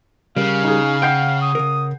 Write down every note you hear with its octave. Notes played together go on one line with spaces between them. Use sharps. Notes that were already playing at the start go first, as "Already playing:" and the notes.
C#3 G3 A#4 F5
D#4 G#4
F#5 G5 G6 C7
D#6
C#3 A#4